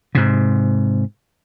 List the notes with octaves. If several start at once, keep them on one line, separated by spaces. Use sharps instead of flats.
G#2 C3